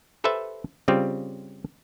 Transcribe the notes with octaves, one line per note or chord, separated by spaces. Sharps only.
G4 A4 B4 C5 E5 A5
C#3 G3 C4 F4 G4